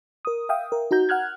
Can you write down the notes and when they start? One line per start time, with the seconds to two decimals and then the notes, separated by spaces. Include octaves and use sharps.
0.25 A#4 D#6
0.49 E5 F5 G5 D#6
0.72 A#4
0.91 D#4 F#4 A#5 G6
1.09 F#5 F6 F#6 G#6